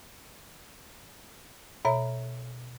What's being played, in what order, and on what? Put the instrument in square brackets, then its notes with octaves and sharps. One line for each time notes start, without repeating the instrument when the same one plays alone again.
[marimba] B2 C#5 E5 A#5